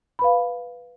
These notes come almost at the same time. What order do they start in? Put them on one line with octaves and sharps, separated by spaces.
B5 B4 F5